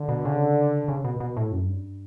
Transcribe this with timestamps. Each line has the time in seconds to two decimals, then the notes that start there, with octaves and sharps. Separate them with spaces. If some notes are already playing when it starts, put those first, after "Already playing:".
Already playing: D3
0.08 B2
0.25 C#3
0.88 C#3
1.05 B2
1.20 B2
1.37 A2
1.52 F#2
1.68 G2